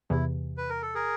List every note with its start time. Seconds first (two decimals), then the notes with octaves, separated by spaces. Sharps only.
0.10 E2 C3 E3 E4
0.57 B4
0.69 A#4
0.82 A4
0.95 G#4 A#4